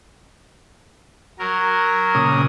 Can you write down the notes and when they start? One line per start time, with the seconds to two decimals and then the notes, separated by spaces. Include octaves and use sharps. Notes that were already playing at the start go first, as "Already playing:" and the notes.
1.39 F#3 A#4
2.15 A#2 C#3 D#6